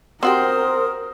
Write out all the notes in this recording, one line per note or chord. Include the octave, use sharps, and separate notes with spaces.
C4 F#4 G4 A#4 C5 D#6